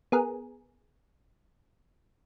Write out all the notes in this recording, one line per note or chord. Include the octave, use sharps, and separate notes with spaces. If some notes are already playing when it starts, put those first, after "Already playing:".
B3 G#4 A#4